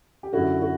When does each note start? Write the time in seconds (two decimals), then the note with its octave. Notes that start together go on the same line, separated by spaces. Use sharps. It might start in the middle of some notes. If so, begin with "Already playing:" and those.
0.23 G4
0.33 F#2 D3 E4 F#4
0.61 F#4